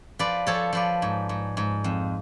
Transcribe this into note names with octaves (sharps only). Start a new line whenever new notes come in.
F3 B4 D5
F3 A4 C#5
F3 B4 D5
G#2
G#2
G#2
F2